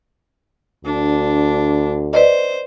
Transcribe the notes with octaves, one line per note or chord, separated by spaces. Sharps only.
D2 D4
B4 C5 D5 D#5